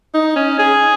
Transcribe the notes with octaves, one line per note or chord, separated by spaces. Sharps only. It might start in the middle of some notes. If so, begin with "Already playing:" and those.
D#4
C#4
G#4